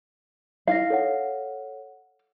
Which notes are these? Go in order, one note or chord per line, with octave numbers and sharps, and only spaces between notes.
D#4 E4 F5 A#6
A4 C#5 F#5